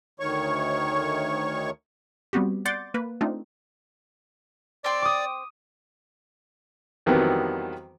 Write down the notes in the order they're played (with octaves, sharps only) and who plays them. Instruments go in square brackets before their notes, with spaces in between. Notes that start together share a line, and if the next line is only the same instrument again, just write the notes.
[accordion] D2 D#3 C#5 C#6
[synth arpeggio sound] G3 B3 C4 F#4 G4
D5 F#5 C6 D6 G6 A6
A#3 B4
A3 C4 D4 D#4 F4
[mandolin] C4 G5 C6 [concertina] D5
[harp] D6 D#6
[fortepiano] F2 D#3 E3 F#3 G3 B3